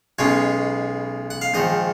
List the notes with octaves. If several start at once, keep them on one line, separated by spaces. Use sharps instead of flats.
B1 B2 G#3 C#4 C#5
F#5
F5
A#1 G#2 D#3 D#5